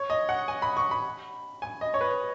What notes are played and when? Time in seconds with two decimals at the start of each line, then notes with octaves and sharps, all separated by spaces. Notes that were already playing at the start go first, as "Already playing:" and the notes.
Already playing: C#5
0.10 D#5
0.29 F#5
0.48 G#5
0.62 B5
0.77 C#6
0.91 B5
1.62 G#5
1.81 D#5
1.94 C#5
2.01 B4